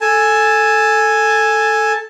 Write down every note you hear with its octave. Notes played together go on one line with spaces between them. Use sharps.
A4 G#5 A5